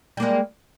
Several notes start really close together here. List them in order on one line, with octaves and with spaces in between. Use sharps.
G3 A#3 G#3